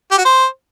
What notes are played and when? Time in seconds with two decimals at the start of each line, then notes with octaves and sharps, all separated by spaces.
0.11 G4
0.18 F#4
0.25 C5